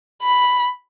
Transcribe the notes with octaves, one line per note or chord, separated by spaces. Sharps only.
B5